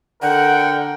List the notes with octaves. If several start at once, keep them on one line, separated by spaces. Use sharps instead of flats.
D3 A#4 F#5 G5